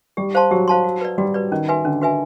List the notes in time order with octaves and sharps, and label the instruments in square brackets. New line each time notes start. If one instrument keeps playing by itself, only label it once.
[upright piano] G3 [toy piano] G4
[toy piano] C5 F5 A5 C6
[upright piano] F#3 [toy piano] G4
[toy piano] C5 F5 A5 C6
F#4
B4 D5
[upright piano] G3 [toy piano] F#4
[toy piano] B4 D5
[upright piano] D#3 [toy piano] C#4
[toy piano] F#4 B4 E5 G#5
[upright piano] D3 [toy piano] C#4
[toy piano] F#4 B4 E5 G#5